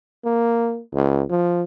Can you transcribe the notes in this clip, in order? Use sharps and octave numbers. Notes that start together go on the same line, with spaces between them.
A#3
C#2
F3